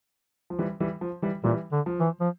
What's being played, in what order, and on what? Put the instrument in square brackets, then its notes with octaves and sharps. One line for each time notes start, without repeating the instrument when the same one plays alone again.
[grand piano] F3
E3 G3
E3 G3
F3
E3 G3
[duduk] A#2 [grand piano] E3 G3
[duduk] D3
[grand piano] F3
[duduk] E3
F3